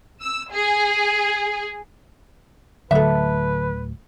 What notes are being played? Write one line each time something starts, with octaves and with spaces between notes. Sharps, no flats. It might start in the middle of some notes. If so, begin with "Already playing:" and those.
E6
G#4
D1 D3 F#3 A3 A4 B4 E5